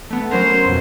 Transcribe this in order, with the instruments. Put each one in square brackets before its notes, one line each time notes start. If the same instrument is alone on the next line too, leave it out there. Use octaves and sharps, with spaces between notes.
[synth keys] A3 B3
[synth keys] F#3 C#4 A#4 [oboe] C5
[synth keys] F2 B2